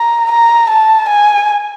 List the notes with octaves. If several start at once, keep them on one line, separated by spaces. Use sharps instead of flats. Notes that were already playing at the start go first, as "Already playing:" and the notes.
Already playing: A#5
A#5
A5
G#5